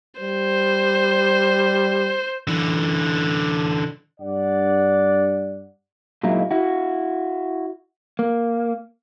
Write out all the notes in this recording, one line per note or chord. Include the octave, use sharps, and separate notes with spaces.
G3 C5
D3 E3
G2 D5 F#5
A#2 F#3 G#3 A#3 D#4 E4
E4 F#4
A#3